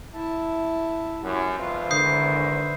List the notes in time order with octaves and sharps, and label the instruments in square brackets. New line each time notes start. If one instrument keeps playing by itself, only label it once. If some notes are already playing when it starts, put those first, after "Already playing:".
[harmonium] E4 E5 A5
[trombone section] F#2 [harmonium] E4 G4 F#5
[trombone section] G#1 F2 F4 [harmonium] B4 C5 E5
[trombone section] E2 G#2 D#3 [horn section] D3 [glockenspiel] D#6 G6 C7